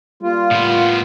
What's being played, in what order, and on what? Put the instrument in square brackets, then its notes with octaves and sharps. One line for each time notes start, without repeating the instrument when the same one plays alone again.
[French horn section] G3 A#3 [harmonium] F4
[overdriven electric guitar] A2 B3